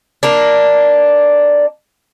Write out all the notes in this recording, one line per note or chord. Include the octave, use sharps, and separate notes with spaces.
A#3 D4